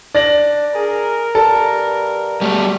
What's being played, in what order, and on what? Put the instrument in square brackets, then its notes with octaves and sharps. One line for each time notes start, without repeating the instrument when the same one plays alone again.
[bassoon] D4 [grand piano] D5 A#6 F#7
[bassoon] G#4 [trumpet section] A#4
[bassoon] G2 [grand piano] A4 A5
[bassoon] F#3 [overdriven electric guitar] G3 A3